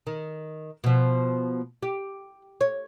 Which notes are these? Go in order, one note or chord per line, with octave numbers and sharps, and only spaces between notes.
D#3
B2 F3
G4
C#5